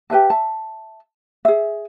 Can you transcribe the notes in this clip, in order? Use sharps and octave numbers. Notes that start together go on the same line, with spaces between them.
G4 B4 E5 A5
E5 A5
G#4 E5